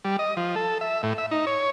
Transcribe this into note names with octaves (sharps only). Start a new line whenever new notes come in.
G3
D#5
F3
A4
E5
A2
E5
D#4
C#5